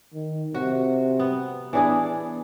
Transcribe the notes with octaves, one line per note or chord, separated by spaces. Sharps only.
D#3
C3 F#4
B3
E3 B3 D4 G#4